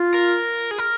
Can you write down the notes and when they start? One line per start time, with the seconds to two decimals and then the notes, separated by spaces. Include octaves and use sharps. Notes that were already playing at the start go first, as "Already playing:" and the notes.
Already playing: F4
0.14 A#4
0.71 G#4
0.79 A#4